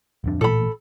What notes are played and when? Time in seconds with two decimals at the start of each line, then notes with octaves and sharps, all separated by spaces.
0.24 D1 F2 D4
0.41 A1 A#2 A4 B5